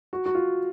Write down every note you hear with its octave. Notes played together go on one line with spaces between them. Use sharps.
F#4
F#4
F4